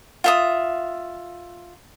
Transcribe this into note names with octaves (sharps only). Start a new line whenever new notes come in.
F4 E5 D#6